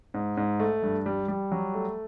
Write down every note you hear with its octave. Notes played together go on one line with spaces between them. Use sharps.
G#2
G#2
A3
G2
G3
G3
F#3
A3